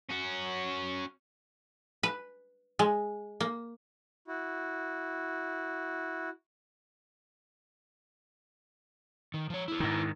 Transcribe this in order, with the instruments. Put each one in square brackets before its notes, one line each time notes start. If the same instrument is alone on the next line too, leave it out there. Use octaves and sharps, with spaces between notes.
[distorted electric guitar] C#4 F#4
[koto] B4
G#3
A#3
[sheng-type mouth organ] E4 F#4
[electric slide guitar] D#3
F3 C#5
E4 G#4
[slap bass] G#2 D#3